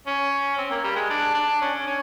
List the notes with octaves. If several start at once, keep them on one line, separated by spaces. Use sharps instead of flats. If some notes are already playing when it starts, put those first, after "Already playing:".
C#4
C4
A#3
G3
G#3
D4
D4
C#4
C#4